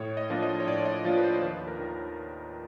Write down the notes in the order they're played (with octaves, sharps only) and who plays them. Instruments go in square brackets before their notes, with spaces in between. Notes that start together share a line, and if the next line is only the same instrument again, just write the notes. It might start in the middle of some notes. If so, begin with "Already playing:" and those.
Already playing: [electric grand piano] A2 C#5
D#5
F3 A#3 D4 F4
D#5
C#5
A2 D5
D#5
F3 A#3 D4 F4 D5
B4
C5
D#2 B4
A#4
D#3